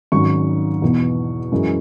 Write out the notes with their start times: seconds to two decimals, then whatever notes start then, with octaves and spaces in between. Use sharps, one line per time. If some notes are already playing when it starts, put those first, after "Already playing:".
0.12 G#1 G#2 F#3 C#4 C#6
0.82 E2 B2 B3
1.52 F#2 E3 G#3